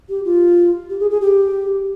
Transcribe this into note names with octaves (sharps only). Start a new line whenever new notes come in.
G4
F4
G4
G#4
G#4
G4